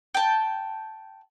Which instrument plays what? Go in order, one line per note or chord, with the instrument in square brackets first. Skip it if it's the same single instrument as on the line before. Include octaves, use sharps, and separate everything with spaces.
[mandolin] G5 A5